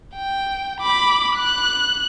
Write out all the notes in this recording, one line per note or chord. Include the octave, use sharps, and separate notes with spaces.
G5
B5 D6
F#6